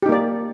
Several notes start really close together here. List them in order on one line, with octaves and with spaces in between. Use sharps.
G4 D#4 A#3 D5